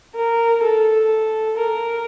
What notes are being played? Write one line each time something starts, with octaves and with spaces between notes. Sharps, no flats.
A#4
A4
A#4